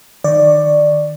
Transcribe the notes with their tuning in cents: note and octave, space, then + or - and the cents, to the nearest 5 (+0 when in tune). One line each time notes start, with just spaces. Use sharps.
D#3 -30 D5 +10 C#6 +0